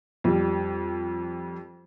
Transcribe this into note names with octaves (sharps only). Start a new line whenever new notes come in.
F2 G3